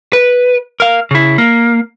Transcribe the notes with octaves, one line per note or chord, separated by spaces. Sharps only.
B4
A#4 F5
C#3 E4
A#3